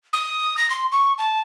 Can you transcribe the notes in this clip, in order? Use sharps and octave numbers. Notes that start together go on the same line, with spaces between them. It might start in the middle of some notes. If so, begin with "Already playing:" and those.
D#6
A#6
C6
C#6
A5